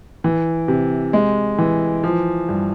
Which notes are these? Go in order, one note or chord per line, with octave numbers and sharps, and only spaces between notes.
E3
C3
G#3
E3
F3
G2